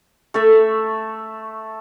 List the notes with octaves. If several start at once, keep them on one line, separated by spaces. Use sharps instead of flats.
A3 A4 E5